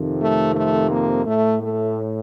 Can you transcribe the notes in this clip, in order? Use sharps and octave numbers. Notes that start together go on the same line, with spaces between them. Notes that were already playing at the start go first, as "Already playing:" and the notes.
Already playing: F2 C3 D#3
A3
A3
A#3
A2 A3
A3